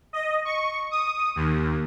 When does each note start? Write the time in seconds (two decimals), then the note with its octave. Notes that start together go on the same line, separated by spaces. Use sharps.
0.13 D#5
0.45 C#6
0.91 D#6
1.36 D#2